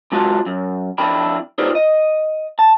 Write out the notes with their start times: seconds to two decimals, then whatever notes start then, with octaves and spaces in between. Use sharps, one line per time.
0.12 C3 G#3 F4 F#4 A5
0.46 F#2
0.98 F2 D4 E4 G5 B5
1.58 D#4 F4 G4 B4 C5 D5
1.75 D#5
2.59 A5